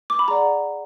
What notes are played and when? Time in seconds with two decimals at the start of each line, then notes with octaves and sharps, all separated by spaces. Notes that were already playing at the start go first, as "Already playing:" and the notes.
0.10 D6
0.19 B5
0.28 G#4 D5 F#5 A#5